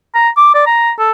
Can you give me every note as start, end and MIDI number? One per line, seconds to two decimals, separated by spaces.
0.14 0.29 82
0.37 0.50 86
0.54 0.66 74
0.66 0.91 82
0.99 1.12 69